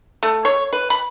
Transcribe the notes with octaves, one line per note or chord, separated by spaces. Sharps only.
A3
C#5
B4
B5